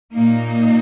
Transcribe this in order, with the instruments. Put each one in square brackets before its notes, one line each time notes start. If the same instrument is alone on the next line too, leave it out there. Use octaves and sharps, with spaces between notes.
[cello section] A#2 A#3 D#4